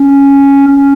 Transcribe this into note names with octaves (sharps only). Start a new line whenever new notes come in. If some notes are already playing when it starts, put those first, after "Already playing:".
Already playing: C#4
C#4